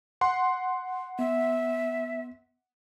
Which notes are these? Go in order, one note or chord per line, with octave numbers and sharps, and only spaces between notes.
F#5 C6
B3 E5